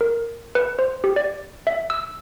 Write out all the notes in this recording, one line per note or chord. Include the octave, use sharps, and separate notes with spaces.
A#4
B4
C5
G4
D5
E5
E6